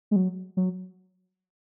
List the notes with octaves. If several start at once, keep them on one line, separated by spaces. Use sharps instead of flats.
G#3
F#3
F#3